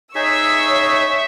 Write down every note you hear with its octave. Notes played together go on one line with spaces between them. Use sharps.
D#4 G#4 C#5 E5 C#6 E6